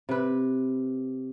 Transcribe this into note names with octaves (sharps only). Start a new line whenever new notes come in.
C3 B4